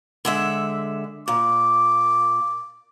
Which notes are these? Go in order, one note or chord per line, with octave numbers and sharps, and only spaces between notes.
D3 G#3 E5
A#2 D6